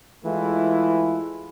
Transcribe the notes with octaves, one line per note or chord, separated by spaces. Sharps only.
E3 G#3 A3 E4 F4